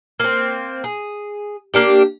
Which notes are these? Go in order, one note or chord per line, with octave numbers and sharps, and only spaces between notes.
A#3 C4
G#4
A#3 D4 G4